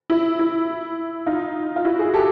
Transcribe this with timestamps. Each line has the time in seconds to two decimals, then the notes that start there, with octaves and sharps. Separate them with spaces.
0.10 E4
0.39 E4
1.26 D#4 F4
1.76 F4
1.85 E4 F#4
1.99 F#4 G#4
2.14 G4 A4